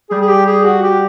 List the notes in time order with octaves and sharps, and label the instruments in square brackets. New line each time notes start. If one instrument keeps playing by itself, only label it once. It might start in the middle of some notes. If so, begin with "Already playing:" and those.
[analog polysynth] G3 [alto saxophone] G#4
[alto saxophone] G#4
G4
G#4
F#4
G4